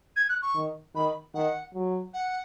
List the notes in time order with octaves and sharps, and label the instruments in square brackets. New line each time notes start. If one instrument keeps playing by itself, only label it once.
[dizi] G#6
F#6
C#6
[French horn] D#3
[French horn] D#3 [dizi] B5
[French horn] D#3 [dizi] F#5
[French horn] F#3
[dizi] F#5